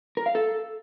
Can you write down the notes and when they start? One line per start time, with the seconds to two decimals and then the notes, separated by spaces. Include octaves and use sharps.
0.17 A#4
0.26 F5
0.35 A4